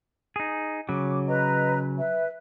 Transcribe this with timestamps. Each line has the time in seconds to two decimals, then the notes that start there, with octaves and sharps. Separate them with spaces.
0.36 D#4 G#4
0.89 C#3 F#3 D6
1.27 B4 D#5 A#5
1.97 B4 E5